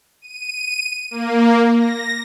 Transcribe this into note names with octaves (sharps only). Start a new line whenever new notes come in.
D#7
A#3
A#6